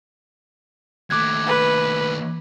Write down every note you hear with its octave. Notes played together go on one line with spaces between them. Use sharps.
D#2 A3 D6 F#6 G#6
B4